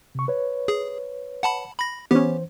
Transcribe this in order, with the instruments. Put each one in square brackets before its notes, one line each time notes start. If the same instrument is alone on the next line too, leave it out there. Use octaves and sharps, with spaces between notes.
[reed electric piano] C3 C#6
B4 C#5
[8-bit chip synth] G#4
F#5 A5 B5
B5 A#6
[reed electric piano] E3 C5 [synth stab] B3 C#4 [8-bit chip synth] G4